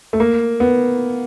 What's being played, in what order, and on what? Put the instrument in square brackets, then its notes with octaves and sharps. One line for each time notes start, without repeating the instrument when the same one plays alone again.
[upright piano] A3
A#3
B3